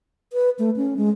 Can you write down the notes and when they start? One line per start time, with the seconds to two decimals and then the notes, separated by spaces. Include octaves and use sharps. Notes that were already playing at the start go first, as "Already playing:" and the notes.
0.33 B4
0.59 A3
0.77 C#4
0.97 G#3